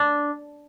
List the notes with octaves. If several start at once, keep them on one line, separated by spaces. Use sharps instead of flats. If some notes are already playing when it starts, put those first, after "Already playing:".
Already playing: D4